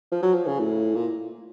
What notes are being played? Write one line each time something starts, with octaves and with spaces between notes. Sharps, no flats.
F3
F#3
F3
C#3
A2
A#2